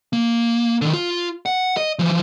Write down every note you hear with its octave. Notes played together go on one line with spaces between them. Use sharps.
A#3
D3 D#3
F4
F#5
D#5
E3 F3